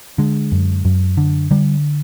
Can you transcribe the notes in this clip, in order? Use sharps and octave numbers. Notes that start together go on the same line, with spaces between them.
D3 G#3
F#2
F#2
D3
D3 G3